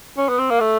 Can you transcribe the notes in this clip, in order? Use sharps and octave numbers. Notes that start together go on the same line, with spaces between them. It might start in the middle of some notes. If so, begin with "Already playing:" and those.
C#4
B3
C4
A#3
A3